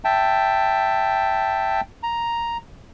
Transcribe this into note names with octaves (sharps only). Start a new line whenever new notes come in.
E5 G5 A5
A#5